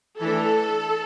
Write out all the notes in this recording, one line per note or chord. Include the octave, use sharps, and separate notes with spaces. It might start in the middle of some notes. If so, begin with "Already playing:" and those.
E3 A3 D4 A4